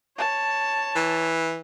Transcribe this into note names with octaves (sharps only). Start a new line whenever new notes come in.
C#5 A5
E3